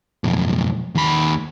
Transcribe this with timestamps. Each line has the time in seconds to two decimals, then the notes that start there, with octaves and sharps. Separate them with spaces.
0.24 B1 F2
0.95 D#2 B5